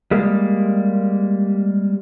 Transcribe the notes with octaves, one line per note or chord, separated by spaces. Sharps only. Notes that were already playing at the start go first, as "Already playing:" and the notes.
G3 G#3 A#3